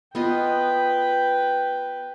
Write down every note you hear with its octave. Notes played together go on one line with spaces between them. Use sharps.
B3 F4 B4 D#5 G5